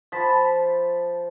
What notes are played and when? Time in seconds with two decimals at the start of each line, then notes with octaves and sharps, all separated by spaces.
0.12 F3 A5 B5